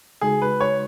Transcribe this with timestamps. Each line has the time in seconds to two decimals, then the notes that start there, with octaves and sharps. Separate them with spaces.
0.21 C#3 G#3 D#4 F#4 G#4
0.42 B4
0.61 C#5